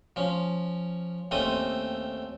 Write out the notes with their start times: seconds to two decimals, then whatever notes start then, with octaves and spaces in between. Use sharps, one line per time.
0.16 F3 C#4
1.31 D#2 A3 C4 C#4 D#6